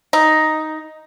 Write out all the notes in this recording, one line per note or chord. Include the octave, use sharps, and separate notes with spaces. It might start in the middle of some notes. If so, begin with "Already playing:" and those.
D#4